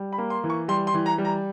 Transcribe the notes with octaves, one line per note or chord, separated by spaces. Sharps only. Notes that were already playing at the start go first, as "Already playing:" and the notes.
Already playing: G3
B5
A#3
C6
E3
C#6
G3 C6
C6
E3
A#5
G3
A#5